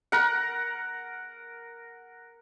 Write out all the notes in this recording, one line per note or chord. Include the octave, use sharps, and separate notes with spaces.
A#4 F#5